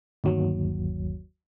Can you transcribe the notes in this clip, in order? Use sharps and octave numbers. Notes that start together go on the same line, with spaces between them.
G1 D#2 F#3